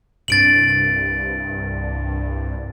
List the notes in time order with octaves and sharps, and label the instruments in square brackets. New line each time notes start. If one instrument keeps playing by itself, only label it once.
[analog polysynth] C2 G2 [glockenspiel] A6 D7 F#7